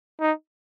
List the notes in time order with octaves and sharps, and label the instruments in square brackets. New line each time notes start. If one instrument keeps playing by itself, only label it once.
[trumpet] D#4